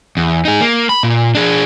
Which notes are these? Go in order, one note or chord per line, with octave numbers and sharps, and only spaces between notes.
E2
D#4 G#4
A#3
B5
A#2
D4 G#4